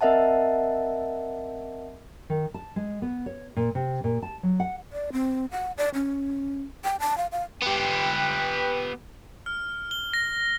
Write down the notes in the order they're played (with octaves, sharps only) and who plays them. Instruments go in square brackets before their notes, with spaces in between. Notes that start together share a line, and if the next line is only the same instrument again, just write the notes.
[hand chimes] C4 A#4 D#5 E5 F#5 A5
[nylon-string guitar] D#3
A5
G#3
B3
C#5
A#2
C3
A#2
A5
F#3
F#5
[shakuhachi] D5
C4
F#5
D5
C#4
G5
A5
F5
F5
[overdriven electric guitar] B3 G4 [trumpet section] B4 G5
[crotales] F6
G7
A#6